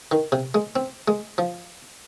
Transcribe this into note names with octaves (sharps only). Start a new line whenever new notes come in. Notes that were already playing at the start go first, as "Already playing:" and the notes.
D#3
C3
G#3
C4
G#3
F3